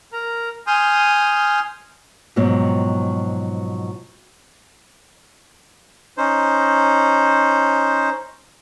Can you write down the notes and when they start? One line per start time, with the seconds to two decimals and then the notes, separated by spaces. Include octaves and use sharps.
0.13 A#4 A#5
0.67 G#5 C6 D#6 F6 G6
2.36 G#2 B2 F3 F#3 C4
6.18 C#4 D#4 C5